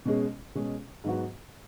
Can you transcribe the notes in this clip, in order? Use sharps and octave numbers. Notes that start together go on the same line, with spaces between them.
B2 G#3 C#4 G#4
B2 G#3 C#4 G#4
G#2 F#3 B3 F#4